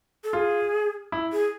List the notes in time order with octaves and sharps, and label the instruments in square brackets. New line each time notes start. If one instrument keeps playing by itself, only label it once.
[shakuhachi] A4
[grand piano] F4 [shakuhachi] G#4
[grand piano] E4
[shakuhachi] G#4